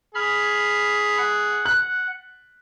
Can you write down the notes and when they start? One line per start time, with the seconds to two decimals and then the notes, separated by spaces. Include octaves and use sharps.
0.15 G#4 B5 F6
1.18 F#5
1.66 F#6